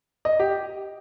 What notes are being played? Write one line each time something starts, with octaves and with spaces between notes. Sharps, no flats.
D#5
G4